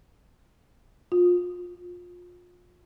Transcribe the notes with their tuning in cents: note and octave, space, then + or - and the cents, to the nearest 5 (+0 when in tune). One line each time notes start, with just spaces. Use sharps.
F4 +25